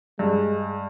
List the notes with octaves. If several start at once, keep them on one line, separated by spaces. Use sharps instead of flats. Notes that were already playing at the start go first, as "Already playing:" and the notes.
G2 G#3